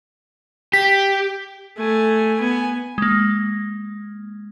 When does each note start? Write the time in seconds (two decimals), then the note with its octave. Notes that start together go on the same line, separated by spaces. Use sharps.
0.73 G4 B6
1.77 A3 G#5
2.40 B3 G#5
2.98 G#3 A#3